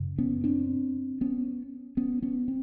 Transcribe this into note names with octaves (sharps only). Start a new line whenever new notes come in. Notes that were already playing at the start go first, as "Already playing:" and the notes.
Already playing: F#2 C#3
B3 C#4
C4 D4
B3 C#4
B3 C#4
B3 C#4
C4